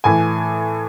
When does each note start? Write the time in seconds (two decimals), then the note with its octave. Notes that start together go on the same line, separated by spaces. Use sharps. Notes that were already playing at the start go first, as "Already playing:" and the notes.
0.04 A2 E3 G#5